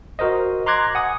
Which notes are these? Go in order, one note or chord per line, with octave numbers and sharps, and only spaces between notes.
F#4 A#4 C5 D#5
A#5 C6 D6 F#6 G#6 A#6
F#5 G#5 D#6